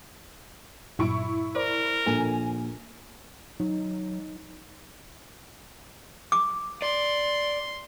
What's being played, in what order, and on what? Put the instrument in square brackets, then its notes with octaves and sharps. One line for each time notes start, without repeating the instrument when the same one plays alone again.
[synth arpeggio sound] G2 A#2 F#3 [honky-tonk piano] E4 C#6 D7
[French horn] A#4 [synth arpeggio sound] C5 D5
[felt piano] A#1 [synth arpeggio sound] A4 [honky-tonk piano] G#5
[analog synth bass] F#3 [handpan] D#4
[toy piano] D6
[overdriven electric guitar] D5 [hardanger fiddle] C6